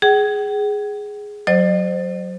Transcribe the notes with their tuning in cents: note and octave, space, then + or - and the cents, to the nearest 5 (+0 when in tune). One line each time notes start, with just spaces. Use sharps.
G#4 +0 G5 -45
F#3 +0 C5 +0 D#5 -45